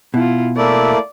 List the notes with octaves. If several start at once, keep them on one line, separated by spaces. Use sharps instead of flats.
B2 E4 F4
A3 A#3 E4 D5